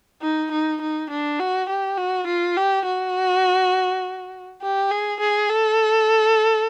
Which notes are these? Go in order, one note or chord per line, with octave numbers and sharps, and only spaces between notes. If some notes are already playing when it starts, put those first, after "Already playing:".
D#4
D#4
D#4
D4
F#4
G4
F#4
F4
G4
F#4
G4
G#4
G#4
A4